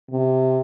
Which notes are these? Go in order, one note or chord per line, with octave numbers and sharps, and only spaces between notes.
C3